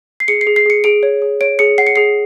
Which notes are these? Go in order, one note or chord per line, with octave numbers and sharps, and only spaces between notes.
C7
G#4 C#7
C7
G#4
C7
G#4 C#7
G#4 D7
C#5
G#4
C#5 D7
G#4 C#7
F#5 C7
C#7
G#4 C7